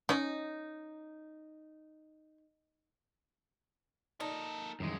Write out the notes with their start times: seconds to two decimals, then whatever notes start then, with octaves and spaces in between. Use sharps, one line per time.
0.09 C#4 D#4 D#5
4.20 A#3 D#4 A4
4.80 F#2 D#3 E3 G3 G#3